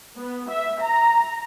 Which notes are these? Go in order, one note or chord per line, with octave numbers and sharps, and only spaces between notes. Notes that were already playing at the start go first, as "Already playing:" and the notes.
B3
E5
A#5